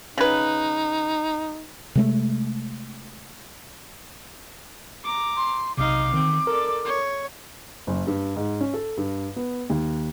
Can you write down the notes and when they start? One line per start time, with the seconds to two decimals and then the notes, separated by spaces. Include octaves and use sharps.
0.18 C#3 D#4 B4
1.95 C3 G#3 A3
5.04 A#5 D6
5.37 C6
5.77 B1 C3 D#4 F5 D6
6.14 D#3 C4
6.47 A4 A#4 D5
6.85 C#5
7.87 F#1
8.07 G2
8.36 G#2
8.61 C#4
8.74 A4
8.97 G2
9.36 B3
9.70 D#2